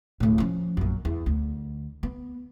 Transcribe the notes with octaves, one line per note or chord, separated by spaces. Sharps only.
D1 A2
F3 C#4
A#1 F#2
E2
D2
B3